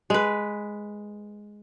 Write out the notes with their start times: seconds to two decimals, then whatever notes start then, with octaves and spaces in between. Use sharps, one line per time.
0.10 G#3 B4